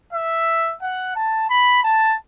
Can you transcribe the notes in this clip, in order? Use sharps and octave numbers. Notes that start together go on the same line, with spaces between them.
E5
F#5
A5
B5
A5